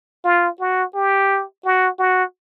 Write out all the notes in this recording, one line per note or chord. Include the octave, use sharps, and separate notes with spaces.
F4
F#4
G4
F#4
F#4